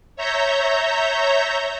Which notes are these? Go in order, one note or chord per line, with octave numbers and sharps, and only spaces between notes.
C#5 E5 A#5 G6